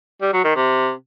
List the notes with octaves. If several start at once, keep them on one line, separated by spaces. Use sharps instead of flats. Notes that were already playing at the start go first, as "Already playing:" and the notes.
G3
F#3
D#3
C3